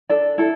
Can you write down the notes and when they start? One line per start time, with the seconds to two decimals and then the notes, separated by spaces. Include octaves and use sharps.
0.09 D4 A4 D5
0.38 E4 A4